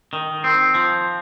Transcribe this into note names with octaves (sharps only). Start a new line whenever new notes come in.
D#3
C4
F3